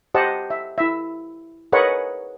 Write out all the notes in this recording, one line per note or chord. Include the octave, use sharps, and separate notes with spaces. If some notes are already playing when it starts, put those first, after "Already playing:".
G4 C5 D#5 F#5 A5
E5
E4 E5
G#4 A#4 B4 C#5 D#5 F#5